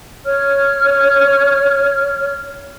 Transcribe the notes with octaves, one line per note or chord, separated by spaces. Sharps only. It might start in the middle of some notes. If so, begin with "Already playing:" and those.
C#5 F6